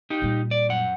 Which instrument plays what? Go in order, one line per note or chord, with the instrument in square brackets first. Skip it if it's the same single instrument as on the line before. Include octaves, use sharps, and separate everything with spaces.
[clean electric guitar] D#4 G4
[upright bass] A#2 G3
[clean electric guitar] D5
F#2 F#5